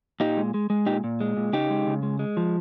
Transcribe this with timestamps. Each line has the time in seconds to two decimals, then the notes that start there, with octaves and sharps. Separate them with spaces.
0.20 A#2 D#4 G4
0.37 G#3
0.54 G#3
0.70 G#3
0.86 A#2 D#4 G4
1.04 A#2
1.21 G#3
1.37 A#2
1.53 C#3 D#4 G4
1.70 G#3
1.87 C#3
2.03 G#3
2.19 G#3
2.37 F3